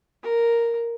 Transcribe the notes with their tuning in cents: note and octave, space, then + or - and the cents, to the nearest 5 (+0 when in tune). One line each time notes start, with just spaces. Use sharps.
A#4 +0